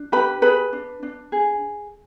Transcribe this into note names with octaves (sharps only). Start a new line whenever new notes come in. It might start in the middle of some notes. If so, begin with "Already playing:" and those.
Already playing: D4
G4 B4 B5
G#4 B4 B5
D4
D4
G#4